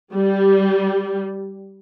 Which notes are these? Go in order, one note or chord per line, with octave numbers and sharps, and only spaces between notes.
G3